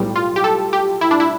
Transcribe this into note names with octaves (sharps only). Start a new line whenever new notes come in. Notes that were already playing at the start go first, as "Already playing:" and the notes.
Already playing: B1 A2 G3
F4
G4
A4
G4
E4
D4
E4